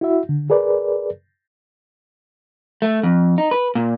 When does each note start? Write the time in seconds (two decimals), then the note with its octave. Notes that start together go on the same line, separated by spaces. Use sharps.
0.01 E4 F#4 E5
0.29 D3
0.50 G#4 A#4 B4 D5
2.82 A3
3.03 F2
3.38 D#4
3.51 B4
3.75 A#2